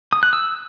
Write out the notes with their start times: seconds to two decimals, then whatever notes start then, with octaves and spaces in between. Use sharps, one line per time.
0.13 D#6
0.23 F#6
0.33 E6